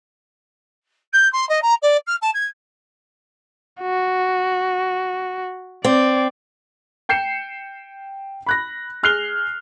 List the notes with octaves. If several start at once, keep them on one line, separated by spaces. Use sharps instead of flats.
G6
C6
D#5
A#5
D5
F6
A5
G#6
F#4
C4 D5
G5 G6 C7 C#7 E7
B5 F#6 A#6
G#4 F6 F#6 C7 F7 G7